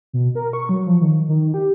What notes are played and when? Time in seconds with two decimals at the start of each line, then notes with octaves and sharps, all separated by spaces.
0.13 B2
0.35 A#4
0.53 C#6
0.69 F#3
0.87 F3
1.01 D#3
1.29 D#3
1.54 G4